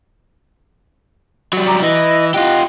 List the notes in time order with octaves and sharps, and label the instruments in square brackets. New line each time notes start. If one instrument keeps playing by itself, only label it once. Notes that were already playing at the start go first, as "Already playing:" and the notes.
[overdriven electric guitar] F#3 G3
[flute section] A#5 D6
[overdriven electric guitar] E3 [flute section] D#5
[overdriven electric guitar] F4 G4 [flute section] D#5 F6 F#6